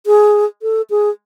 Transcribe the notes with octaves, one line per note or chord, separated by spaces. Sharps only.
G#4
A4
G#4